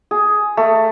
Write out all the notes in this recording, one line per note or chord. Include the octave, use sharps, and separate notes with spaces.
G#4
A3